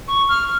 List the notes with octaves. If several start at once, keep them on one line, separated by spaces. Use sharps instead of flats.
C#6
F6